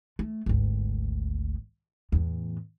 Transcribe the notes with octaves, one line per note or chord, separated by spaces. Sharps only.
A3
G#1 D2
E2 A2